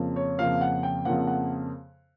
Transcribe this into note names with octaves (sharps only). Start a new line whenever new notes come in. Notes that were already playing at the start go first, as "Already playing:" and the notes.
Already playing: F2 C#3 F3 A#3
C#5
F2 C#3 F3 A#3 F5
F#5
G5
F2 C#3 F3 A#3 F#5
F#5